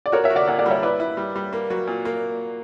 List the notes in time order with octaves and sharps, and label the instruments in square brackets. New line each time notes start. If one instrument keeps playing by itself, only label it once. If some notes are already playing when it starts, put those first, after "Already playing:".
[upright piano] D5
[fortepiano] F#4 [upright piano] A#4 C#5
[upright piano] C#5 E5
[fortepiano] F#4
[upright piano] D5 F#5
[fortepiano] A#2 [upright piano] D5 F#5
[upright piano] D5 F#5
[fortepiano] G3 [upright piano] C#5 E5
[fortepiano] E4 [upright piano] B4 D5
[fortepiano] E4
G3
G3
A#3
F#3
A#2
A#3